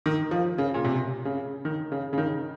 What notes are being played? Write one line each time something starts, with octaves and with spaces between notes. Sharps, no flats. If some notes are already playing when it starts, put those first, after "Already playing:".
D#3
F3
C#3
A#2
C3
C#3
D#3
C#3
C#3
D#3